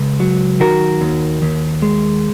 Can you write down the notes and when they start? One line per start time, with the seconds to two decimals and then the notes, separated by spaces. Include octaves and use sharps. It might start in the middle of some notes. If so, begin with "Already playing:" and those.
Already playing: C#2
0.20 F#3
0.60 D#3 F#4 A#4
1.01 D#2
1.42 D#2
1.82 G#3